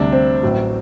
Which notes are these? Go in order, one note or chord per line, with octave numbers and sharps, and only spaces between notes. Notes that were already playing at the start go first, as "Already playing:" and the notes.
Already playing: D2 C3 G3 D4
C4
A1 A2 F#3